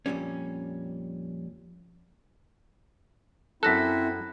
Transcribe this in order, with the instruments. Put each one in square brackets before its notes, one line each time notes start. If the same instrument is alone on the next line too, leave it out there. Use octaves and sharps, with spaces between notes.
[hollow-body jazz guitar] F2 A#2 G3 C#4
[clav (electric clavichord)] F#2 A4 [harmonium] C4 E4 [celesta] F#6 A#6 B6